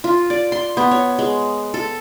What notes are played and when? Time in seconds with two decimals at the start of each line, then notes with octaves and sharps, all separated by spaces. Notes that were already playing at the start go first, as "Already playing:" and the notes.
0.04 F4
0.30 D5
0.52 C6
0.77 B3
0.91 C#5
1.19 G#3
1.74 A4